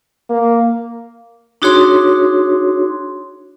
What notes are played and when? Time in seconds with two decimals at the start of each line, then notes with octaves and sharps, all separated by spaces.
0.30 A#3
1.62 D4 D#4 F#4 G#4 C#5 C6